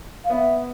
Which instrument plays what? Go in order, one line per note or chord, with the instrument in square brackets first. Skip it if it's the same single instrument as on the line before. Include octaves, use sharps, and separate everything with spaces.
[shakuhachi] F5
[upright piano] B3 [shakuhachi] E5